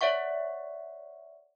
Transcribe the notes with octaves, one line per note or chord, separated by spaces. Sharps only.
C#5 D5 E5 F#5 C#6